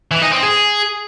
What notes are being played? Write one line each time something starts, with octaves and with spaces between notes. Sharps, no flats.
E3
D#4
C4
G#4